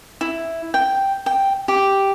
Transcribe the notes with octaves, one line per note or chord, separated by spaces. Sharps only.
E4
G5
G5
G4